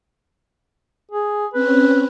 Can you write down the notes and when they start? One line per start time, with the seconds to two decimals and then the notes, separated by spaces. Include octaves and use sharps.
1.12 G#4
1.54 C4 C#4 B4